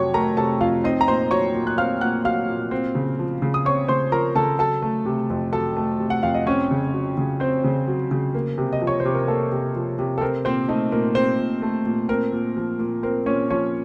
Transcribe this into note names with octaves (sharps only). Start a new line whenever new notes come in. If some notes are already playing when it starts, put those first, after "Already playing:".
Already playing: F2 C3 F#3 A3 C#5 C#6
A3 A#4 A#5
C3 A4 A5
F2 F4 F5
C4 D#4 D#5
A#5
A#2 C5 C6
F#3 C#5 C#6
A#2
F#6
C4 F5 F6
A#2 F#5 F#6
F#3 F5 F6
A#2
C4
C#3
F3
C#3
D#6
C4 C#5 C#6
C#3 C5 C6
F3 A#4 A#5
C#3 A4 A5
F#3 A4 A5
A3
C3
F2
F#3 A4 A5
A3
C3
F#5
F2 F5
D#5
C4 C#4 C#5
C#3
F#3
C#3
C4 C5
C#3
F#3
C#3
A#3
C3
D#5
F3
C#5
C5
C3
A#4
A#3 A4
C3
F3
C3
A4
C4 A#4
A#2 C4 C5
A3 D#4 D#5
A#2 A#4
C4 C5
A#2
A3
A#2
C4 A#4
A#2
F3
A#2
C4 A#4
A#2 C#4 C#5
F3 C#4 C#5